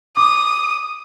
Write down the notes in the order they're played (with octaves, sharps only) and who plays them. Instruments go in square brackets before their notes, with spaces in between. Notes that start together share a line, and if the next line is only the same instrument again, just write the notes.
[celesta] D6 [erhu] D#6